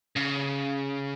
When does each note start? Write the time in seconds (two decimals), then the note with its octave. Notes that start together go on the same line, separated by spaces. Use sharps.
0.16 C#3